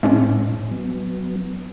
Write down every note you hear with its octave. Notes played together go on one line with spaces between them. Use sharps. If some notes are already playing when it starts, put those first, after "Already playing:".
A2 G#3 C4 C#4
F#3 B3